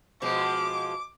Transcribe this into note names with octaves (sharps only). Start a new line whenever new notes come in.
B2 F3 G#3 D6